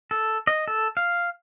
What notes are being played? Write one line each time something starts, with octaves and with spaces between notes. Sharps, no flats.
A4
D#5
A4
F5